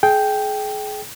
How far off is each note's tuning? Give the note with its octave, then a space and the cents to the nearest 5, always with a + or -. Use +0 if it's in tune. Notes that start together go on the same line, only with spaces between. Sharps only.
G#4 +30 G5 +0